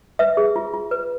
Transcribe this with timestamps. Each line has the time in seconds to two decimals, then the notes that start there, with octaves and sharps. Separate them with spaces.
0.19 B4 E5
0.37 G#4
0.56 F4
0.73 F4
0.91 B4